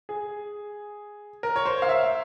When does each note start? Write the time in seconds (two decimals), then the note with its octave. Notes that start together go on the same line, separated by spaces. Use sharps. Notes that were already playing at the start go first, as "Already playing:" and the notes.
0.09 G#4
1.43 A#4
1.56 C#5
1.66 C5
1.82 F5
1.89 E5